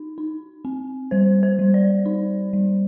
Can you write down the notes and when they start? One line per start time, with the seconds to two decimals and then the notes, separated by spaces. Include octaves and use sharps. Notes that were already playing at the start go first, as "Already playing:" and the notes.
Already playing: D#4
0.18 D#4
0.65 C4
1.11 G3 C5
1.43 C5
1.59 G3
1.74 D5
2.06 D#4
2.53 G3